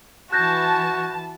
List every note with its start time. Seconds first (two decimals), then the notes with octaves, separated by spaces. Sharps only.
0.33 E3 F#4 A5 F#6 G6 A#6